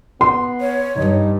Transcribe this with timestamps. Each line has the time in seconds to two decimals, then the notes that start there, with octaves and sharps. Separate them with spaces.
0.21 B3 C6
0.61 C#5
0.96 G2 D#4